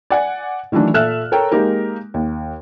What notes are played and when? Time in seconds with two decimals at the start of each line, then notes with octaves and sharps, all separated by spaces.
0.10 D5 F#5 G#5
0.72 D#3 E3 F#3 A3 D4
0.94 A#2 A4 E5 F6 F#6 E7
1.32 A4 A#4 C#5 G5 A#5
1.52 G#3 A#3 D#4 G4 A#4
2.14 D#2